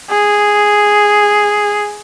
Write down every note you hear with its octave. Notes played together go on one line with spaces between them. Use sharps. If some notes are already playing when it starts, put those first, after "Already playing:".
G#4